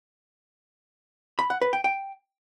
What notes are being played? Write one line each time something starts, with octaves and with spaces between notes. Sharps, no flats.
B5
F#5
B4
G5
G5